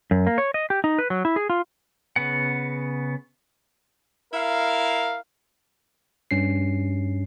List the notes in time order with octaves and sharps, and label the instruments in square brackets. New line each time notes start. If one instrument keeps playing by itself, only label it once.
[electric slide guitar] F#2
A#3
C#5
D#5
G4
D#4
B4
F#3
E4
G#4
F4
[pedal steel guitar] C#3 B3 F#5
[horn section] E4 A#4 F5
[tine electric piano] G2 C#4 C7